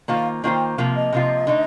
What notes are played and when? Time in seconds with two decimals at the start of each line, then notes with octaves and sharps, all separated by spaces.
0.08 D#3 A#3 F4 C5 F5
0.43 D#3 A#3 F4 C5 G5
0.77 C3 F3 A#3 F4 F5
0.95 D#5
1.12 C3 F3 A#3 F4
1.47 D3 A3 D#4